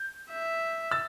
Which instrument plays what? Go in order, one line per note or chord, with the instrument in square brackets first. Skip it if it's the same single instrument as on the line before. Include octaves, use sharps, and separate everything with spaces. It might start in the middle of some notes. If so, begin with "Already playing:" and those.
Already playing: [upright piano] G6
[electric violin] E5
[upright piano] E6 A6